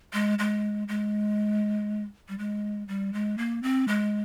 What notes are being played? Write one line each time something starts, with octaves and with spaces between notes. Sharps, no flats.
G#3
G#3
G#3
G3
G#3
G3
G#3
A#3
C4
G#3